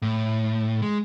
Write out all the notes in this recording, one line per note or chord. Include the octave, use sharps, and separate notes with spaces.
A2
G#3